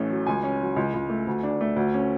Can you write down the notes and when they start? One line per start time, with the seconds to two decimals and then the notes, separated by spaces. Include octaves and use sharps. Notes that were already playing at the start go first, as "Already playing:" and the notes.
Already playing: A1 A3 C#4
0.10 F#3
0.27 C#2 G#5
0.43 C#4
0.61 F#3
0.76 C#2
0.94 C#2
1.10 A3
1.27 D2
1.43 D4
1.61 A3
1.76 D2
1.94 C#4